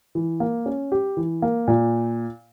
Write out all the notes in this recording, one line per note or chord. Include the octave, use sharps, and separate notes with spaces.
E3
A#3
C#4
G4
E3
A#3
A#2